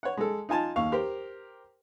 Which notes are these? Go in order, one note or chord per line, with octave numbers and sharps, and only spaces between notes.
C#5 F#5
G#3 A4
D#4 F4 G#5 A5
D#2 F5 C#6
G4 A#4 C5